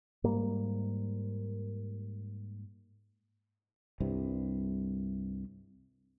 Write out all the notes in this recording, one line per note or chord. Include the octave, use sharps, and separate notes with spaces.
G#2 G3 A#3
C2 G2 C3